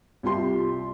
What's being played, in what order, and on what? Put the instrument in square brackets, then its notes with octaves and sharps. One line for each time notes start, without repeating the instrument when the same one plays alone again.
[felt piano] C2 F4 G4 C6